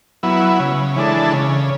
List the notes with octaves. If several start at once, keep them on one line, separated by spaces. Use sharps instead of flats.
F#3 B3 E4
C#3
E3 G#3 D4 A4
C#3